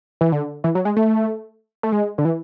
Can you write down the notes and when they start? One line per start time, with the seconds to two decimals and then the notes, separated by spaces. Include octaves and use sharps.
0.21 E3
0.32 D3
0.64 E3
0.75 F#3
0.85 G#3
0.97 A3
1.83 A3
1.92 G#3
2.18 D3
2.25 E3